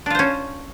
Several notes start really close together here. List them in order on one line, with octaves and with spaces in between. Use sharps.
D4 F4 C5 C#4